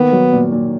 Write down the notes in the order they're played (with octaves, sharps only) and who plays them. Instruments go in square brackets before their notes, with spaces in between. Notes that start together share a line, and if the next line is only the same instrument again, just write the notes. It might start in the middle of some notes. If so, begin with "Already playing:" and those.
Already playing: [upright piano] D#3 A#3 [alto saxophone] B3
[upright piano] F#3
A#2
A#2